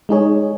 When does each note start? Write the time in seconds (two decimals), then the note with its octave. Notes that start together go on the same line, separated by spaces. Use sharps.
0.09 G#3 D#4 G#4 C#5